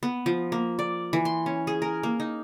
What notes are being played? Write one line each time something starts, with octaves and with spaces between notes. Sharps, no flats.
B3
F3
A#3
D5
E3
C6
C#4
G#4
A#4
A#3
D#4